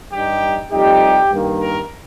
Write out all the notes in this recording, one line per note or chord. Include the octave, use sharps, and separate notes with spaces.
G2 G3 D#4 G4
F2 C3 G3 D#4 G4
G2 D#3 A#3
A#4